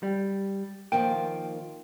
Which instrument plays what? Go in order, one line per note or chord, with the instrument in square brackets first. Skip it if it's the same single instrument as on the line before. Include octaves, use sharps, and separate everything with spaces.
[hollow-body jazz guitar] G3
[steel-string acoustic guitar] D#3 F3 A#3 [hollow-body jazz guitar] G5